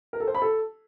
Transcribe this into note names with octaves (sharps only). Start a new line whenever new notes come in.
A#4
A4
C5
B5
A4